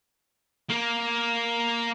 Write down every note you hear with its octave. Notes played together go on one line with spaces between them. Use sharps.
A#3